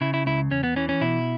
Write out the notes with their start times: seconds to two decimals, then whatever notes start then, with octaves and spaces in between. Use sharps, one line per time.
0.01 C#3 E4
0.14 E4
0.26 C#2 E4
0.51 E2 C#4
0.63 B3
0.76 E3 C#4
0.89 C#4
1.01 B2 E4